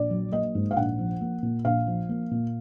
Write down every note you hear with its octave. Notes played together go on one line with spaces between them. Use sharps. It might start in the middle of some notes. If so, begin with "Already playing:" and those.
Already playing: A#1 D5
F#3
A#3 D#5
G#2
F5
A#1 F#5
F3
A#3
A#2
A#1 F5
F3
A#3
A#2